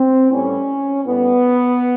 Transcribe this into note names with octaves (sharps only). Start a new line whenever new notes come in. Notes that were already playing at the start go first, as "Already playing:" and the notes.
Already playing: C4
A2 E3 G3 C#4
A2 E3 G3 B3